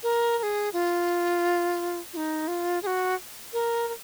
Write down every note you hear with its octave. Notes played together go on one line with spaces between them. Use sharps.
A#4
A#4
G#4
F4
F4
D#4
F4
G#4
F#4
A#4
A#4